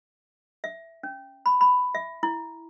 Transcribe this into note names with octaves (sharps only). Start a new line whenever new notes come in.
E5
C#4
B5
B5
E5
E4